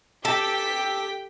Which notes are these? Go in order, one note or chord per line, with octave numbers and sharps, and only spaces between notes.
G4 A4 G5 B6